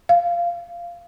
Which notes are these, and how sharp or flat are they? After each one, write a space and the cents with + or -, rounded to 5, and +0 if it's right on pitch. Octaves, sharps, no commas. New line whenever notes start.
F5 -10